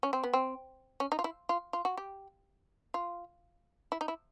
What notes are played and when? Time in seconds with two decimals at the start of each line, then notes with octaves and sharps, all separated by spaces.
0.03 C#4
0.13 C4
0.23 B3
0.33 C4
1.00 C#4
1.12 D#4
1.19 F4
1.24 E4
1.49 F4
1.73 F4
1.85 F#4
1.97 G4
2.94 F4
3.92 E4
4.01 D#4
4.08 E4